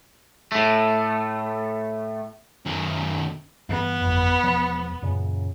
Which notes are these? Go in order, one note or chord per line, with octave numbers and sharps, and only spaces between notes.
A2 A3
F#2 D#3
G2 E3 B3
G1 F2
E1 F3
F#2 A#2 C#3